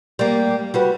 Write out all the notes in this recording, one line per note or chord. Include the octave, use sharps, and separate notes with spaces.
G3 A#3
G3 F#4 B4